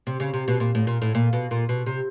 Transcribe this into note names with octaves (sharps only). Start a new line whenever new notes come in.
C3
C#3
C3
B2
A#2
A2
A#2
A2
A#2
B2
A#2
B2
C3